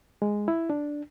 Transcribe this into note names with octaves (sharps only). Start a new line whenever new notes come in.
G#3
E4
D4